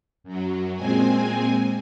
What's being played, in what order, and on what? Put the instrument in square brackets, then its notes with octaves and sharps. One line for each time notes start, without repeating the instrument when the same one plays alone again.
[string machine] F#2 F#3
A#2 G#3 C4 G#5